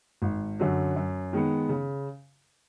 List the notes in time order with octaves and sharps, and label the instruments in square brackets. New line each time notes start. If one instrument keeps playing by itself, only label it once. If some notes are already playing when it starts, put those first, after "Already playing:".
[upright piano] G#1
F#2 D3 F#3
F#2
D#3 G#3 B3
C#3